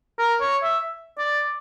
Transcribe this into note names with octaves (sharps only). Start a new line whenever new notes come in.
A#4
C#5
E5
D5